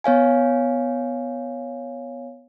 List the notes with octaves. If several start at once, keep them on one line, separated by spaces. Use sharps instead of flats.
B3 C#5 F5 G#5